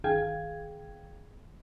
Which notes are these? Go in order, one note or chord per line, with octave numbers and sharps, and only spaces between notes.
G1 D#3 G#4 F5 G5 G#6